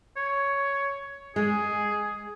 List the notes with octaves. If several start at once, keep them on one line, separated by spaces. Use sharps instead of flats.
C#5
G#3 G#4